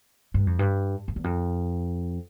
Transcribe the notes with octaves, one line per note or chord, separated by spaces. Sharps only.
G2
F2
G2
F2
E2
F2